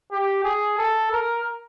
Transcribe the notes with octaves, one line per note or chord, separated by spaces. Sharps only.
G4
G#4
A4
A#4